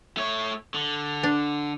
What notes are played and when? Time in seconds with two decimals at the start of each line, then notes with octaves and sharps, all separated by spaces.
0.17 A3 C#5
0.74 D3
1.23 D4